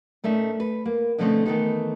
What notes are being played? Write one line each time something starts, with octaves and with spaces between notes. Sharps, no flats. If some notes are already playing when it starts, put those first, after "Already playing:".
A#2 A3 C#4 D#4 E5
B4
A#3
B2 D3 F3 A3 C4 C#4
D#3 E3 G#3 A3 B3 D#4